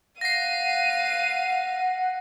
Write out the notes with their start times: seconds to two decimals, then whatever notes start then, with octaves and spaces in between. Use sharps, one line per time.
0.21 F5 F#5 A#6 C7 D#7